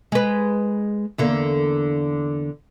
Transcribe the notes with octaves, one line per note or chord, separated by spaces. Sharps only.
G#3 B4
E2 D3 A#3